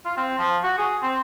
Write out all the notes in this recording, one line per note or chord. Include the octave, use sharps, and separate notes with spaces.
F4
C4
F3
F#4
G#4
C4